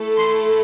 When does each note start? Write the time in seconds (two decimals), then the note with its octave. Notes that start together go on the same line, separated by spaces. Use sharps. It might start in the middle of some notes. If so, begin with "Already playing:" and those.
Already playing: A3 E4 A4
0.17 C6